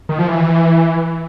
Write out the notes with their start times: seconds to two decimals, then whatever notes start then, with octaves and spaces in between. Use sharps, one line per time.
0.09 D#3
0.19 F3
0.28 E3